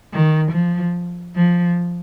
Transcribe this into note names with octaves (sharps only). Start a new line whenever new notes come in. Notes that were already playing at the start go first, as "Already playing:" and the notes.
D#3
F3
F3